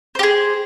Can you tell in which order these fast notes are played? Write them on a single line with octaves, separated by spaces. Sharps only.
C5 G4 G#4